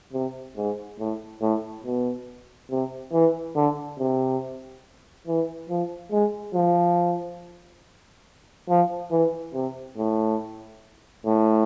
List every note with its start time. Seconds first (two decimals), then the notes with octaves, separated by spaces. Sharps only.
0.13 C3
0.57 G#2
0.99 A2
1.41 A2
1.84 B2
2.71 C3
3.13 E3
3.55 D3
3.99 C3
5.27 E3
5.69 F3
6.11 G#3
6.54 F3
8.69 F3
9.11 E3
9.54 C3
9.97 A2
11.26 A2